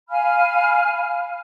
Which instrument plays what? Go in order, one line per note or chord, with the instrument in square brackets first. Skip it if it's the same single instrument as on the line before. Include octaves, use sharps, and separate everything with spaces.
[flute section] F5 G#5 B5 F6